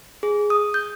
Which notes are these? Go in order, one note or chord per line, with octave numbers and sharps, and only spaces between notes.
G#4
D#6
G6